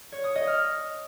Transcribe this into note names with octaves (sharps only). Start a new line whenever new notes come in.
C#5
D#6
D#5
F6